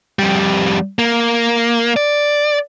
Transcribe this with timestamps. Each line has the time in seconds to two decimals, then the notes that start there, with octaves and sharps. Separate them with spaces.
0.19 F2 G3
0.99 A#3
1.97 D5